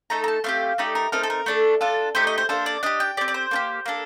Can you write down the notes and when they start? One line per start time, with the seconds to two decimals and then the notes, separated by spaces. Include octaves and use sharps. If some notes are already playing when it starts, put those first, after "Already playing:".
0.10 A3 D#4 A4 A#5
0.24 A#5
0.28 A5
0.44 A3 C4 G4 F5
0.78 A3 D#4 G4 D5
0.95 A#4
1.12 A3 C4 D#4 A4 A#4
1.23 A4
1.30 A#4
1.46 A3 D4 A4
1.81 D4 F4 A4
2.15 A3 D#4 G4 C5
2.27 D#5
2.38 C5
2.49 A#3 D4 A4 C5
2.66 D5
2.83 D4 G4 D#5
3.00 G5
3.17 G4 D5
3.21 C4
3.28 D5
3.34 C5
3.51 A#3 D4 G4
3.86 A#3 D4 A4